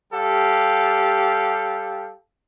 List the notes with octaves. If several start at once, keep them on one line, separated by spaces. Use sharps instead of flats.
G3 G4 A4 F5